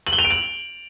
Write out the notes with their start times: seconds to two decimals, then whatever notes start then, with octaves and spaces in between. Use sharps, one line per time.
0.07 F#7
0.13 G7
0.19 F7
0.24 D7
0.30 F#7